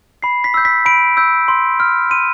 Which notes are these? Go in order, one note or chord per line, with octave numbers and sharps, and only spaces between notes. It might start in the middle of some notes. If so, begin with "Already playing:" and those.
B5 C7
B6
E6 G6
B6
B5 D7
E6 G6
C6
F6
C6 D#7